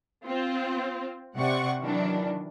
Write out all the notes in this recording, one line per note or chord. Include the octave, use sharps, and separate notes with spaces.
C4 F4
C3 D5 F#5 C#6
D#3 E3 F#3 D4